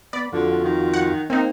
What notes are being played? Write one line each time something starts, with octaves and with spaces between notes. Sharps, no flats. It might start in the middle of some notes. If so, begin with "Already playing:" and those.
B3 D5 B5
F2 D3 F4 F#4
D#3
F#5
A#3 C4 D#4